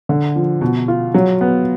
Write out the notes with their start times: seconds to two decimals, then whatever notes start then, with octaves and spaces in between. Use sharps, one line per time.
0.09 D3
0.36 F3
0.61 B2
0.88 F4
1.14 F#3
1.41 B3